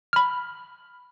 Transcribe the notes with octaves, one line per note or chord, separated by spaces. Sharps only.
B5 F6